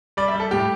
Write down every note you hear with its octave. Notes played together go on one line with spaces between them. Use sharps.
G3 D5
E5
G3
A4
A2 G4